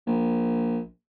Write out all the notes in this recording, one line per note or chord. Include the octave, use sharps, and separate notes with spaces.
A#1